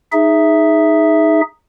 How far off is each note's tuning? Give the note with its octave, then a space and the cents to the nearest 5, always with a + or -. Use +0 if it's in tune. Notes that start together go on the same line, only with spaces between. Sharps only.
D#4 +0 G#4 +0 E5 +0